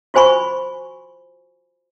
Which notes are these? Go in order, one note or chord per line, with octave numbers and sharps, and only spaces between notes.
F4 F#4 C5 G#5 B5 C#6